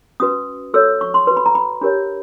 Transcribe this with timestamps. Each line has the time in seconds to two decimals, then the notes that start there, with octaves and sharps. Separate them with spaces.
0.20 C#4 F#4 B4 D#6
0.74 F#4 A4 C#5 E6
1.01 C#6
1.14 C6
1.27 F#4 B4 C6
1.37 B5
1.46 A#5
1.55 B5
1.81 D4 G4 A#4 C#5 B5